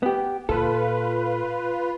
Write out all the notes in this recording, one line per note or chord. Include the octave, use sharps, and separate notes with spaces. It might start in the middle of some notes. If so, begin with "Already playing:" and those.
B3 G4
A#2 F4 A4 B4